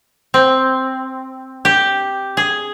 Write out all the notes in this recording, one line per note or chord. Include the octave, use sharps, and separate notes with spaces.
C4
G4
G#4